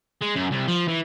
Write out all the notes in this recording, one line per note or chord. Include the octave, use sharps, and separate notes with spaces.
G#3
F#2
C2
F3
E3